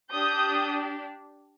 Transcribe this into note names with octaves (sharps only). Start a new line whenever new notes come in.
D4 G4 D#6 G6